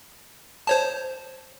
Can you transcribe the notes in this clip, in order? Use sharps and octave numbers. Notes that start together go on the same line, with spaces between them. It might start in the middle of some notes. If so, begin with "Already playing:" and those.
C5 C#5 A5